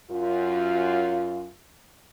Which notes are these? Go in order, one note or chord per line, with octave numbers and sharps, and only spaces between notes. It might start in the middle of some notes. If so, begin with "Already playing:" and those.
F#2 F4